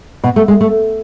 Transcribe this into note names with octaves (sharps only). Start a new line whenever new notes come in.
B2
A3
G#3
A3